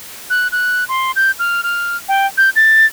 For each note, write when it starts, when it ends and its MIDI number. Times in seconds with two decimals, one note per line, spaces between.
0.30 0.48 90
0.52 0.84 90
0.89 1.12 84
1.16 1.31 91
1.39 1.61 89
1.64 1.97 89
2.08 2.27 79
2.38 2.50 91
2.56 2.86 93